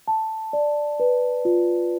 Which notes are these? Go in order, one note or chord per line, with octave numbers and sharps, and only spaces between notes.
A5
D5
B4
F4